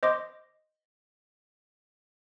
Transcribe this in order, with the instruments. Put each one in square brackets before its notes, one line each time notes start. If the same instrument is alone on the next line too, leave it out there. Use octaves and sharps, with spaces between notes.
[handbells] C5 D#5 C6 D6